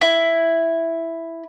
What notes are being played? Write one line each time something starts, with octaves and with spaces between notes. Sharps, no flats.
E4